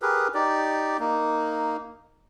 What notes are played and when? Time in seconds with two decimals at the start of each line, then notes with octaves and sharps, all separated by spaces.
0.02 G4 G#4 A#4 B4
0.34 D#4 G4 D5
0.99 A#3 D#4